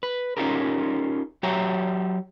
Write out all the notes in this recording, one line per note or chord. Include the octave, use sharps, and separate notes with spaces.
B4
C#4 D#4 F4 G4 G#4 A#4
F#3 G4 C#5 E5 A#5